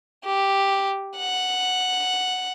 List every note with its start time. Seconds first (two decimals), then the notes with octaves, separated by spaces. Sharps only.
0.24 G4
1.17 F#5